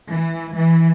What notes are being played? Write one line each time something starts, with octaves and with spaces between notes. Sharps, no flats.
E3
E3